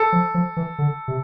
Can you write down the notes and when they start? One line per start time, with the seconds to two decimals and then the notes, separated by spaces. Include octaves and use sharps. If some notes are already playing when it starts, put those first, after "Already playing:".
Already playing: A4
0.12 F3
0.34 F3
0.57 E3
0.78 D3
1.08 C3